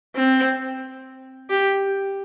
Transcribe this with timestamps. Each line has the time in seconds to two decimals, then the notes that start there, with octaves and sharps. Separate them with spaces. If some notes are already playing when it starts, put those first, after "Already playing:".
0.16 C4
1.50 G4